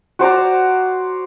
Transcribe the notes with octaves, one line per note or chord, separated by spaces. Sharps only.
F#4 C5 D5 A#5